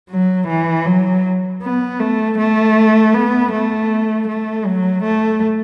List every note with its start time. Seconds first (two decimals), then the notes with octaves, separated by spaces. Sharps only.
0.10 F#3
0.48 E3
0.86 F#3
1.62 B3
2.00 A3
2.38 A3
3.15 B3
3.52 A3
4.28 A3
4.66 F#3
5.04 A3